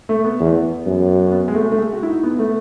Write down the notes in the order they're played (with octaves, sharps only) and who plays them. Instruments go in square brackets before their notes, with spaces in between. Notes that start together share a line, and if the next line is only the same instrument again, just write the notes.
[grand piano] A3
B3
[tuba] E2
F#2
[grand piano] C#4
B3
G#3
A3
A3
G#3
F#4
E4
D#4
B3
A3